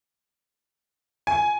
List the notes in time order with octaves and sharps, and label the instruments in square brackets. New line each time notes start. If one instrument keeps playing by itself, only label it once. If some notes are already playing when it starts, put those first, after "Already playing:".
[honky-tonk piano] G#5